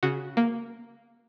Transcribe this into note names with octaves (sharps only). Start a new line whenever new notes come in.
C#3 F#4
A#3